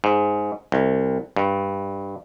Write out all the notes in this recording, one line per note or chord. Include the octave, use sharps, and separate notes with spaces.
G#2
C2
G2